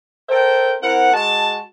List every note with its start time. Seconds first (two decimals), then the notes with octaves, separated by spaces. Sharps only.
0.29 A4 A#4 C5 E5 G5
0.82 C4 E4 A#4 F#5
1.12 G#3 F#4 A5